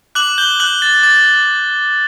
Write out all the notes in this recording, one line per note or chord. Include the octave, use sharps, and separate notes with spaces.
D6 F#6 F#7
G6 G7
F#6 F#7
A6
D6 A6